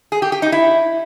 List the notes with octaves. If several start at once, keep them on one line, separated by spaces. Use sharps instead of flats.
G#4
G4
G4
D#4
E4